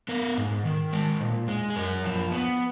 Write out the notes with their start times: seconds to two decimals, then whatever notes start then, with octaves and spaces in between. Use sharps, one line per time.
0.08 B3 A#4
0.37 G#2
0.65 D#3
0.93 G#3 A#4
1.20 A#2
1.48 G#3
1.70 G#4
1.76 F#2 A#4
2.04 F3
2.31 B3